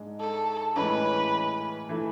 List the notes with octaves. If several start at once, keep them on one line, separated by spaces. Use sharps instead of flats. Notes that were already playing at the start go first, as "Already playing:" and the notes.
Already playing: G#2 G#3 D4
A4
A2 E3 G#3 C#4 B4
E3 A3